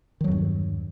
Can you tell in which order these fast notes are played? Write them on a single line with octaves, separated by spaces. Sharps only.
D#3 F#3 E2 G2